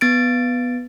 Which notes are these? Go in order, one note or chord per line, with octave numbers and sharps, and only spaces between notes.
B3 A6 D7